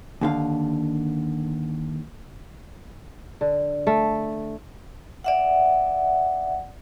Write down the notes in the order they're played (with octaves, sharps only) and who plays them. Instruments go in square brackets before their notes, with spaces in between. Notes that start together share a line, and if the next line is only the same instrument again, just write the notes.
[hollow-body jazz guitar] D#2 D3 F5
[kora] D3
A3
[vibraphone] D5 E5 F#5